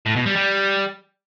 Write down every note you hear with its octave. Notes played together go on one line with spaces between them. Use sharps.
A2
B2
G3
G3